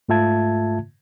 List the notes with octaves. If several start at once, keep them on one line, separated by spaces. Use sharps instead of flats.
G#2 A3 F4 E5 A5 G#6